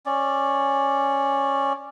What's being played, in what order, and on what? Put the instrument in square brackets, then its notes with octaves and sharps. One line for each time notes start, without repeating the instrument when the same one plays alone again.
[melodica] C#4 D5